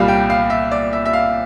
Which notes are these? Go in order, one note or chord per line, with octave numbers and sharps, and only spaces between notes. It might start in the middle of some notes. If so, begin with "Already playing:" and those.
Already playing: C2 A#2 G3 F5
G5
F5
E5
D5
E5
E5
F5